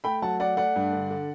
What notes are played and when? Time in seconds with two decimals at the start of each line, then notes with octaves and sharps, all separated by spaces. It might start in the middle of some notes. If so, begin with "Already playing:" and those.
0.04 A3 G5 B5
0.22 F#3 F#5 A5
0.39 A3 D5 F#5
0.57 A3 D5 F#5
0.76 G2
0.93 D3
1.11 D3